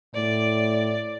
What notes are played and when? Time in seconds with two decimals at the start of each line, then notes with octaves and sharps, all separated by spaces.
0.15 A2 D5